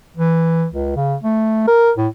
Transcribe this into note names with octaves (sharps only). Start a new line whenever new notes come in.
E3
C#2
C#3
A3
A#4
A2